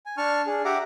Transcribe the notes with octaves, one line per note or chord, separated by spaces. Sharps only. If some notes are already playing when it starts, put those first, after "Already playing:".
G#5
D4 A5 C#6 F6
D4 G#4
G4 E5 F#5 A#5 D6